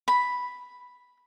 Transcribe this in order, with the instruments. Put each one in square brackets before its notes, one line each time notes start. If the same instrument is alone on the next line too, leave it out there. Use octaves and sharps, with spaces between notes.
[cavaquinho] B5